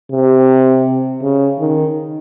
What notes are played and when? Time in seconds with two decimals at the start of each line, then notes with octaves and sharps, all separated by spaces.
0.12 C3
1.22 C#3
1.60 D#3